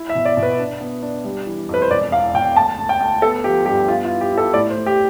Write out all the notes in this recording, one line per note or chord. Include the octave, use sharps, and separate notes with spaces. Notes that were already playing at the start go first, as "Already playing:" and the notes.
Already playing: E4
E5
B2
D5
B2
B4
D4
B3
D4
G3
E3
F2
B4
C5
E1 D5
E2 F5
E1 G5
D2 A5
D2
G5
D2
B3 A4
F3 G4
G2 G4
B3 F4
F4
E4
G4
E4
A4
A2 D5
C5
A2
G4